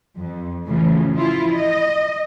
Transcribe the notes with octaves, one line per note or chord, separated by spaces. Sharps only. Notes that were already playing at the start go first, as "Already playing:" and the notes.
F2
A2 C#3 E3 F3
F3 E4 F4
D#5